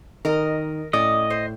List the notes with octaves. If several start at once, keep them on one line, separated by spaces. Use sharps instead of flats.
D#3 A#4 D#5
A2 C#4 D5 D#5
C5